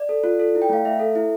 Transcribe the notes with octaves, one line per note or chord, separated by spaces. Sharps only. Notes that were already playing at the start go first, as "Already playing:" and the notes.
Already playing: D5
A4
F4
A4
E4
G5
A3 F5
A3 E5
A4
E4